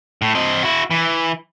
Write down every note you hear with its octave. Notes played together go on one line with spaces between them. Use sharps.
A2
C4 D#5
E4 F#4
E3